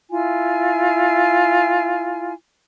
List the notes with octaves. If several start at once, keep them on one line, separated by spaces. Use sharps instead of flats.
E4 F4 G#5